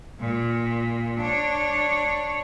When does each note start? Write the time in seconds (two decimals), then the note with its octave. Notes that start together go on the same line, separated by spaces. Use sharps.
0.20 A#2
1.21 D4 C#5